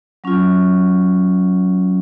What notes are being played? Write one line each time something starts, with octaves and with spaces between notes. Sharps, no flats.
F#3 C#4 F4